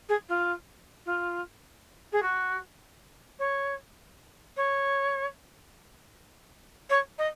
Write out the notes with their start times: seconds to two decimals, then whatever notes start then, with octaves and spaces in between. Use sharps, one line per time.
0.09 G#4
0.29 F4
1.06 F4
2.12 G#4
2.22 F#4
3.39 C#5
4.57 C#5
6.90 C#5
7.18 D#5